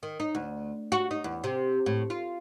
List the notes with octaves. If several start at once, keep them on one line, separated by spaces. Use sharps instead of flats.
D#3
D#4
D2
F#4
D#4
E2
C3
A2
F4